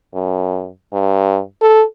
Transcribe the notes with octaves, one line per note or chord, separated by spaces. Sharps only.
F#2
G2
A4